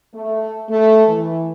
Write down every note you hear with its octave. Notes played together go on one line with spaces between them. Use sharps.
A3
A3
E3